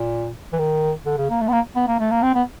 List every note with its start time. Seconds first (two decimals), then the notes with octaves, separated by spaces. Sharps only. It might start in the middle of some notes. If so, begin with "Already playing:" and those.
Already playing: A#2
0.53 E3
0.59 D#3
1.06 D3
1.18 C#3
1.30 A#3
1.41 A3
1.48 B3
1.52 A#3
1.76 B3
1.88 A#3
2.00 A3
2.11 A#3
2.23 C4
2.35 B3